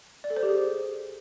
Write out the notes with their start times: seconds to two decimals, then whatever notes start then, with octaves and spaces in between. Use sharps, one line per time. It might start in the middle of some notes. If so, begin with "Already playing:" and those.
0.24 D5
0.30 A4
0.36 C5
0.43 G4
0.49 G#4